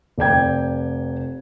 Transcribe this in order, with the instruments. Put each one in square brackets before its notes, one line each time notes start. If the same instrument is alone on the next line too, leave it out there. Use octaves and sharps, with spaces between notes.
[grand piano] F1 D5 G5 G#6